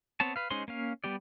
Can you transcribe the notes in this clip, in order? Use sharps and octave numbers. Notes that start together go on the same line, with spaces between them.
B3 C4 C#5 A5
B4 F5
G#3 C#4 D#4 C5 C6
A#3 C#4 F5
G3 B3 G4 D5